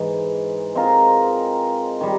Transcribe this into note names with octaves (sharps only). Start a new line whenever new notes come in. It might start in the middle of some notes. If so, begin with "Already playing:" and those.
Already playing: G#2 E3 G#3
G#3 C4 F4 A#4
D#3 G3